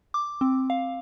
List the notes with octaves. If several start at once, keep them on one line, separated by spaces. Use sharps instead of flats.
D6
C4
F5